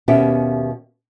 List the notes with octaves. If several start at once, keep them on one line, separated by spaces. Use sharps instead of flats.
D#2 B2 B3 C#4 G4 E5